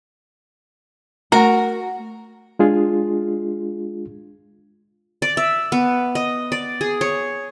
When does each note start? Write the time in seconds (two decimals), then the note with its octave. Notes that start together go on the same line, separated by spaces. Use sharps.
1.32 A3 F#4 A#4 F#5 A#5
2.59 G#3 D4 F4 G#4
5.22 D5
5.37 E5
5.72 B3
6.15 D#5
6.52 D5
6.81 G#4
7.01 C#5